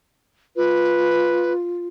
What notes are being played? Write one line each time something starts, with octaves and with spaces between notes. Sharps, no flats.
F4 B4